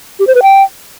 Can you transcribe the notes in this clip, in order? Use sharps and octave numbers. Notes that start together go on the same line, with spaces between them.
G4
C5
B4
G5